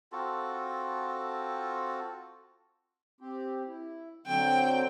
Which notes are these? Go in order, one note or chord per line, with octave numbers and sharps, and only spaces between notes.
C4 F4 F#4 A4
C4 G4
E4
D3 F#3 C4 G5